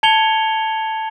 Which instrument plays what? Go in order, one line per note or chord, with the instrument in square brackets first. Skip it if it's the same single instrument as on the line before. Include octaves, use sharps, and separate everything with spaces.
[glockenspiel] A5 G#6 C#7 F7 G7